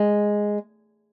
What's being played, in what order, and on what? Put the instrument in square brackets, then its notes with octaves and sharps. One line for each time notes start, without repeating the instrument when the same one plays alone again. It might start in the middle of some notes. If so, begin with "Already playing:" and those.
Already playing: [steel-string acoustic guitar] G#3